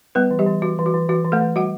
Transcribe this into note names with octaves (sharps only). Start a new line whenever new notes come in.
G3 B3 B4
E3
G3 G4
E3
E3 F#4
E3
F#4
E3
E3 F#4
E3
A3 A4
E3
G3 F#4 F#5